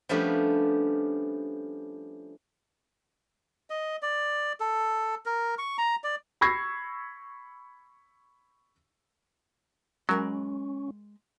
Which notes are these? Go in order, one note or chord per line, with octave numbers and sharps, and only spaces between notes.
F3 G3 A3 B3 C#4 D4
D#5
D5
A4
A#4
C#6
A#5
D5
B5 C#6 E6 G#6 A#6 C7
F#3 G#3 C#4 A#4 B5